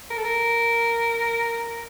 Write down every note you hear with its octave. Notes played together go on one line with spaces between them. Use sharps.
A#4
A4
A#4